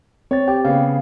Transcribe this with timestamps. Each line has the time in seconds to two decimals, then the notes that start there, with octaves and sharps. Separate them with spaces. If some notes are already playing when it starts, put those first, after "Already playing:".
0.31 C4 C#5 A6
0.48 G4 G5 D6
0.65 C#3 B3 F5